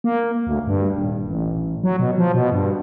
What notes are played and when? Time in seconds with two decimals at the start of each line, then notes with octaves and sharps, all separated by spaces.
0.04 A#3
0.47 D2
0.67 G2
0.94 D#1
1.28 A1
1.84 F#3
1.99 B2
2.18 F3
2.34 B2
2.52 G2